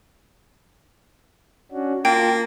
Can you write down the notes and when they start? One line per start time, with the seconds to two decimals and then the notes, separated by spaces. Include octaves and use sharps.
1.72 C#4 D4 F#4
2.05 A#3 F4 G5 A5